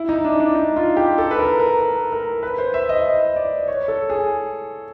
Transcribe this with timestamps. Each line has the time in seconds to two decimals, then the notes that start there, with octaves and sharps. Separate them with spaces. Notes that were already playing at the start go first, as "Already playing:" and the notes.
Already playing: E4
0.09 D#4
0.24 D4
0.40 D4
0.55 D#4
0.76 F4
0.97 G4
1.18 A4
1.31 B4
1.39 A#4
1.60 A#4
1.80 A#4
2.12 A#4
2.43 B4
2.58 C5
2.74 E5
2.89 D#5
3.06 D#5
3.36 D5
3.68 C#5
3.88 A4
4.10 G#4